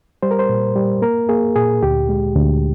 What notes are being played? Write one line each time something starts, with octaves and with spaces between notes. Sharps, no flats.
G3 C5
A#4
C5
A#2
G3
A#3 A#4
A#3 G#4
A#2 G#4
D2 G4
G#3
D2